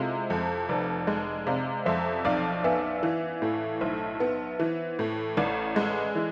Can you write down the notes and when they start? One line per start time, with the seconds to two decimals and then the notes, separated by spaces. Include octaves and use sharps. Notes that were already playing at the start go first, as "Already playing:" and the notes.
Already playing: C3 G#3 E4 F4 A4
0.30 F2
0.69 F1 B4 D5
1.07 G#3
1.47 C3 D5 F5
1.86 F2 C5 E5
2.25 B1 D5 F5
2.64 B3 E5 G#5
2.98 E5
3.03 E3 D5 F5
3.42 A2
3.81 B1 C5 E5
4.20 B3
4.59 E3
4.99 A2
5.37 A1 B4 D5
5.76 G#3 A4
5.90 G#4 B4
6.15 E3